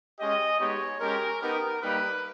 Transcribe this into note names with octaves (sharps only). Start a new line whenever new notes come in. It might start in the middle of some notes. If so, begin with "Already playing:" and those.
G#3 C#4 G4 D#5
G#3 B3 D#4 G4 C#5
G#3 C#4 G4 A#4
B3 D#4 G4 A#4
G3 A#3 D#4 G4 B4